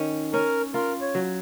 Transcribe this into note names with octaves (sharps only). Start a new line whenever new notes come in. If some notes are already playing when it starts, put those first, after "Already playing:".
Already playing: D#3 C#4
C#4 A#4
F4 A#4
C#5
F#3